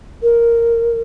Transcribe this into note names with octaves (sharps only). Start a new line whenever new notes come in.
A#4